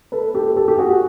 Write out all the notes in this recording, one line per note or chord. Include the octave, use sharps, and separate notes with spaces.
A4 B4
G4 A4
G4 A4
G4
F#4 G#4